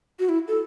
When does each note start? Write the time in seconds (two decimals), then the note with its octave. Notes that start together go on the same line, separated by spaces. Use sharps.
0.19 F#4
0.29 E4
0.48 A4